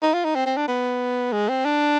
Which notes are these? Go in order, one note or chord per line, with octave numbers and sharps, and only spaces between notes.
D#4
F4
D#4
C4
C4
D4
B3
G#3
C4
D4